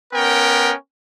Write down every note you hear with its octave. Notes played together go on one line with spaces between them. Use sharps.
B3 C#4 A#4 G5